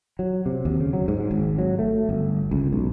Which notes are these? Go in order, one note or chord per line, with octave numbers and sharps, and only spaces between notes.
F#3
C3
D#2
C#3
F#3
G#2
G#1
F#3
A3
G1
C#2
B1